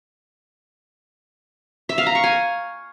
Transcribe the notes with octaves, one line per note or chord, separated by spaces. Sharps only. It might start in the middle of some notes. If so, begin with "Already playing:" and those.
E5
F5
A#5
C#6
G#5